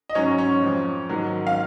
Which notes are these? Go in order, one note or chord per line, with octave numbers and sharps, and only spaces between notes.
D#5
G#2 F#3 C#4 C#5
C#4 C#5
F2 F3
G#2 D#3 F#3
F5